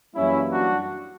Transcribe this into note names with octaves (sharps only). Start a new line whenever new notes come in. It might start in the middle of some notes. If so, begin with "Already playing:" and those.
F#2 E3 G3 A#3 C#4 E4
D4 F#4